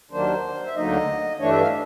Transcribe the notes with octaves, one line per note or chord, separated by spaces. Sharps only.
D#2 D#3 F#3 A#3 D4 C5
E5
D2 D3 F#3 A#3 D#4 D#5
G2 E3 A3 D4 C#5
E5
F5